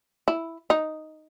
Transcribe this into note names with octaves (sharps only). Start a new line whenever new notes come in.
E4
D#4